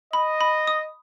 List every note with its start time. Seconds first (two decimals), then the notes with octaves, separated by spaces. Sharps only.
0.13 D#5 B5
0.41 B5
0.67 D#6